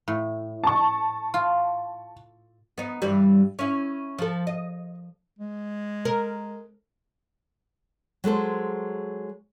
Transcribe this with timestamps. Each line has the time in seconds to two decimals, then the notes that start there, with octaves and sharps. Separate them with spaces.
0.08 A2
0.64 A5 C#6
1.34 F4
2.78 B3 D#4
3.02 G2 E3 G3
3.59 C#4 E4
4.19 F3 A4
4.47 D#5
5.39 G#3
6.05 A#4
8.24 F#3 G#3 A4 C5